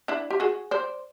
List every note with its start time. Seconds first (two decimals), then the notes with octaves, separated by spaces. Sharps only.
0.08 D4 E4
0.30 G4
0.40 F#4 G#4
0.71 C5 D5